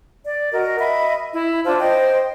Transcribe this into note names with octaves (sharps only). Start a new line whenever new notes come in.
D5
F#4 A#4 D#5
D#5 E5 B5
E4
D4 F4 C5 A5
C5 D#5 G5